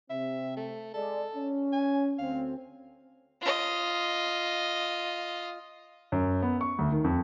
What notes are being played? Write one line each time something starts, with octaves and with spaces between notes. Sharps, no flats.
C3 C4 E5
A3
G#3 A4 D5
C#4
G#5
D2 C4 F5
F4 D#5
F#2
B3
C#6
D2
D#3
F2